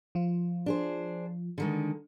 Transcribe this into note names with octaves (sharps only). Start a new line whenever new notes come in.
F3 F4
D4 G#4 C5
D3 D#3 G#3